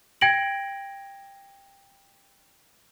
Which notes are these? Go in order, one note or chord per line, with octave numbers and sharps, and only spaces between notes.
G5 G#6 A#6 D7 F#7